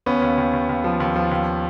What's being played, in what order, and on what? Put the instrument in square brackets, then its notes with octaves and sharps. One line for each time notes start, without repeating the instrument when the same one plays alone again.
[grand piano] D#2 B3 C#4
D#2
D#2
D#2
D#2
F3
D#2
F3
D#2